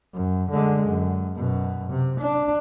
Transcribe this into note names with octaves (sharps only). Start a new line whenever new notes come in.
F#2
D3 G#3
F#2
F#2 B2
C3
D4